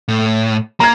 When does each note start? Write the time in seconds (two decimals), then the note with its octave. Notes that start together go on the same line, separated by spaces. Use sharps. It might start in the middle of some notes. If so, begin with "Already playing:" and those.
0.08 A2
0.80 A#3 A#5 G#6